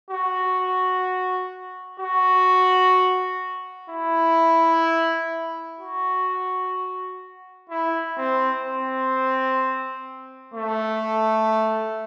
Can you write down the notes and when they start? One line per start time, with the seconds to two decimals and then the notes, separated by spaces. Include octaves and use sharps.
0.11 F#4
2.00 F#4
3.90 E4
5.79 F#4
7.70 E4
8.18 C4
8.65 C4
10.54 A3